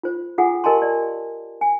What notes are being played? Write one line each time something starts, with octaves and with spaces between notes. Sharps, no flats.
F4 C5
F4 G#4 F#5 G#5 D#6
G4 A#4 D#5 G#5 A5 C6
D5
G#5